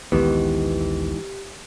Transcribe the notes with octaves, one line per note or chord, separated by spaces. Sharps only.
A#1 D#2 G#2 D#3 E3 B3 G4